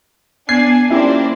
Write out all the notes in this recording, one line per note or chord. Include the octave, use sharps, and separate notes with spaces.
B3 D4 G#5 G#6 C7
A#3 C#4 D4 E4 G4 C5